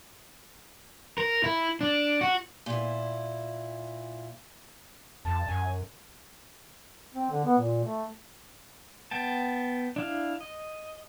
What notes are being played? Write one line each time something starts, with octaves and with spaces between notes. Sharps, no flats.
A#4
E4
D4
F#4
A#2 E4
F2 A5
F#2 G#5
C4
D3
B3
A#2
A3
B3 G5 A5
D4 E4 F5
D#5